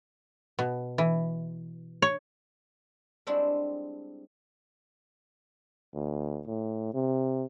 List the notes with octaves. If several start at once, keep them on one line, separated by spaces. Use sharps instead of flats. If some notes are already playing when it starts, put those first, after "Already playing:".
B2
E3
C#5
G3 G#3 C4 D4 E4 F#4
D2
A2
C3